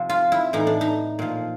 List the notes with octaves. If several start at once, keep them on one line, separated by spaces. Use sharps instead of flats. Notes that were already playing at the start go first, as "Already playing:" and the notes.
Already playing: C3 F3
F4
E4
A2 E3 D#4
D4
D#4
A#2 F3